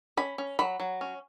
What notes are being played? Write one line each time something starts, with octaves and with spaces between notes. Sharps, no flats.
C#4 B5
C#4
F#3 B5
F#3
C#4